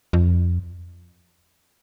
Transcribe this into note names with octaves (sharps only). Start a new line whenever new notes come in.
F2